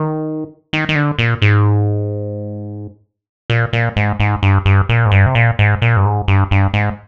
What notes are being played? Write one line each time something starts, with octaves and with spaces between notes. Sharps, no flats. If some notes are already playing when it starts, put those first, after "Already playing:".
Already playing: D#3
D#3
D#3
D3
A#2
G#2
A#2
A#2
G#2
G#2
G2
G2
A#2
G#2
G2
C3
A#2
G#2
A#2
G2
G#2
G2
G2
G#2